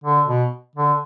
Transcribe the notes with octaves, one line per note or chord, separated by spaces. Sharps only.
D3
B2
D3